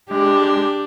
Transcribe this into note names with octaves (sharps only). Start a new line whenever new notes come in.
G#3 D4 G4